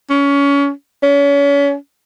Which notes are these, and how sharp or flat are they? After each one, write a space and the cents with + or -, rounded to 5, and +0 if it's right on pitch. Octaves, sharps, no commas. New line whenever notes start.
C#4 +25
C#4 +35